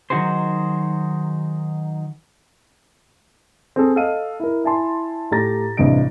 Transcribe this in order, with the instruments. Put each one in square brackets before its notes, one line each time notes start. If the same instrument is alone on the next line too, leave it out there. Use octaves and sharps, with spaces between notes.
[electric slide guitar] D#3 F#3 D#4 F#4 G#4 C5
[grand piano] C4 G#4 A4
A4 D#5 F5 D#7
E4 A#4
E4 G#5 A5 C6
A2 A3 G4 A#5 A6 A#6
A1 G2 C3 D#5 D7